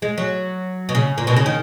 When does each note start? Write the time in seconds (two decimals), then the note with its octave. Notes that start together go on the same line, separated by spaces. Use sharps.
0.02 G#3
0.18 F#3
0.89 B2
0.95 C#3
1.18 A#2
1.27 B2
1.36 C#3
1.46 D#3